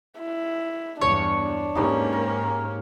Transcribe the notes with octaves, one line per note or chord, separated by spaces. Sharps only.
E4
E2 G2 D4 C#5
G#2 A#3 C#4 D#4 G4 B4
A#4